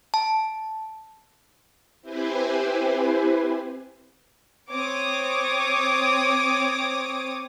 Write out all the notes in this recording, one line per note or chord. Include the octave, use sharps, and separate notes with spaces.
A5
C4 E4 G4 B4 C5 G#5
C4 C#5 D6 D#6